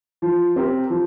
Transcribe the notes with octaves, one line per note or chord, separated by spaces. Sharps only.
F3
C4 G4 A#4
F3